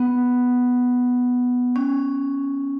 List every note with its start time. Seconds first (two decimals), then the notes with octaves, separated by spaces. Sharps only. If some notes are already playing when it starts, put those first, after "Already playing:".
Already playing: B3
1.76 C#4